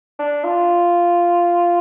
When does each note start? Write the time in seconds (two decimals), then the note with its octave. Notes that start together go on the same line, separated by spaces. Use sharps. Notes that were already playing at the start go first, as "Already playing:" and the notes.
0.19 D4
0.44 F4